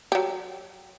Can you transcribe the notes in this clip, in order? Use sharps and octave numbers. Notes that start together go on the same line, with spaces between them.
F#3 G4